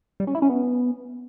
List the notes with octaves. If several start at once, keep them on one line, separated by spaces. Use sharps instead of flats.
G3
C#4
E4
C#4
B3